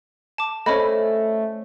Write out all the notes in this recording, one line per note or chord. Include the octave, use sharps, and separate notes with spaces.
A5 D6
A3 C#4 C5 C#5 D#5 G#5 B5